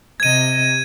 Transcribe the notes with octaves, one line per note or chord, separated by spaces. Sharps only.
C3 D#5 G#6 D#7